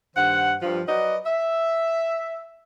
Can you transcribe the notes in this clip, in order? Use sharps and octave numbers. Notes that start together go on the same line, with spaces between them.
G2 D#3 C5 F#5
G2 F3
F#3 F#4 A#4 B4 D5 D#5
E5